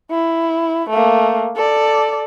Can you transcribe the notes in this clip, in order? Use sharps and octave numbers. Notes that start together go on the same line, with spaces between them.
E4
A3 A#3
A4 D5